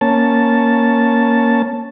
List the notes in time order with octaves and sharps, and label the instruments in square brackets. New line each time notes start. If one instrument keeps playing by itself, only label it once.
[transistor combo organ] A#3 C#4 A5